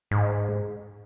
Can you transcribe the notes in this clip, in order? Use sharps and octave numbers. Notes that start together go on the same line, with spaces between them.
G#2